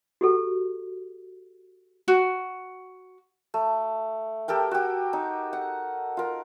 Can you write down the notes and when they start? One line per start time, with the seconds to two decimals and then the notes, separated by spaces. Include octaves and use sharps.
0.21 F#4 G4 A4
2.08 F#4
3.54 A3
4.48 G4 A4 A#4 G5
4.71 F#4 G4
5.13 D#4
5.53 F#5
6.17 F4 A#4